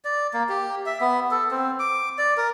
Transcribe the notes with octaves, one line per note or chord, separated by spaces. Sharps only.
D5
A#3
G4
E5
B3
A4
C4
D6
D5
A#4